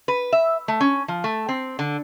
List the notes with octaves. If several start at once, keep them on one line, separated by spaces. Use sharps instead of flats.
B4
E5
A3
C#4
F3
A3
C4
D3